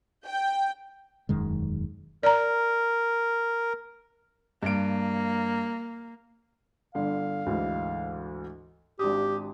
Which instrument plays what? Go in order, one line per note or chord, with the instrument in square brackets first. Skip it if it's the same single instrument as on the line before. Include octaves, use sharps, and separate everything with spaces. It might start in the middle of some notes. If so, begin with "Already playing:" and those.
[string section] G5
[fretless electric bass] E1 F#2 D#3 G#3
[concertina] A#4 [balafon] D5 A#5
[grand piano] G2 D7 [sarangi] A#3
[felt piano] G1 D3 [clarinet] F5
[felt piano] D2 G#2 E3
[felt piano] G#1 D4 D#6 [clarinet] G4